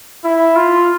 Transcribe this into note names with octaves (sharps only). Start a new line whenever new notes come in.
E4
F4